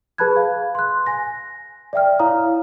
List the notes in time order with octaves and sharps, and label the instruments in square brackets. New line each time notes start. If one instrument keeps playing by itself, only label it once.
[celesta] G#4 B4 A5 B5 F#6 G#6
F5
C6 F#6
G#5 A#6
D5 E5 G5 F6
E4 C#5 F5 A#5 D#6